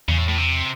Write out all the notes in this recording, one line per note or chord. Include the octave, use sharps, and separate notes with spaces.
E2 C#3
A2
A2
C3